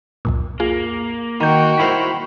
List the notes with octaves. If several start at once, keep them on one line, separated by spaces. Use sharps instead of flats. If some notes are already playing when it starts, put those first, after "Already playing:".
C2 F2 A#2
A#3 F4 G#4
D#3 F#4 G5 A#5 G6
E4 A#4 C5 B5